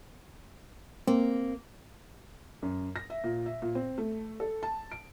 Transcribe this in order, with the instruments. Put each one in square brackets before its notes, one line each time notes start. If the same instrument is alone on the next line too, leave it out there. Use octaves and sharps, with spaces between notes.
[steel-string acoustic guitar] A#3 [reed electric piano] C4
[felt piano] F#2
A#6
E5
A#2
E5
A#2
C4
A3
A4
A5
D7